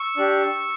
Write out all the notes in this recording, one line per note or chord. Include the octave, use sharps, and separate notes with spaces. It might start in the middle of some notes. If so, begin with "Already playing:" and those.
Already playing: C#6 E6
D4 G4